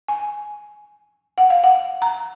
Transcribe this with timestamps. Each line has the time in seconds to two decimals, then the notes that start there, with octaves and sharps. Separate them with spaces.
0.08 G#5
1.38 F#5
1.50 F5
1.64 F#5
2.02 A#5